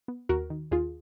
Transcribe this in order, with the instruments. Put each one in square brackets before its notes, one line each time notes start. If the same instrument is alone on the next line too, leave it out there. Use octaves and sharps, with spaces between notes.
[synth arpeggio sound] B3
D#2 F#4 A#4
D#3
D#2 F4 G#4